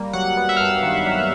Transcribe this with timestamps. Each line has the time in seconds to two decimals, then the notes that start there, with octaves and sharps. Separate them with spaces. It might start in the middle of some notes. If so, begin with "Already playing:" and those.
Already playing: G3 A#3
0.13 F#3 F#5
0.37 B3
0.49 E5
0.57 F5
0.61 G2 E5
0.83 D#3
1.07 F#3